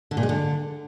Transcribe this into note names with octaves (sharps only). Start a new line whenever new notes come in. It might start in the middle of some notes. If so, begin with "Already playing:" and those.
D3
A#2
G#3
D3